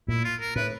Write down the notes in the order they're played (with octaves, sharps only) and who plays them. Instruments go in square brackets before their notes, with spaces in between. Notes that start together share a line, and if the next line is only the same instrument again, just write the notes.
[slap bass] A#2 [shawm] E4
[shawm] F4
A#4
[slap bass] A2 [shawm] B4